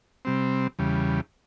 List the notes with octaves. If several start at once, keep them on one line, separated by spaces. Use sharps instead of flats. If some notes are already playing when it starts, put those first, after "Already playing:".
C3 G3 C4
E2 C#3 G3